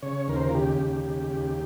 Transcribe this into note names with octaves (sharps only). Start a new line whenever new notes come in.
C#3 C#5
D#2 A#4
C5
A#4
F4
C#3 G4
D#2
C#3
D#2